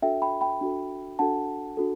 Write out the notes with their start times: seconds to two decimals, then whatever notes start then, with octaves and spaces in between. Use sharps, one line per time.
0.02 D4 F#4 A4 E5 G5
0.22 G5 B5
0.41 G5 B5
0.61 D4 F#4 A4
1.19 D4 F#4 A4 F#5 A5
1.77 D4 F#4 A4